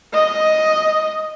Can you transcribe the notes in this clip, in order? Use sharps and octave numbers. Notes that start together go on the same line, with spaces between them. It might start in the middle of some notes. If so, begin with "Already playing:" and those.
D#5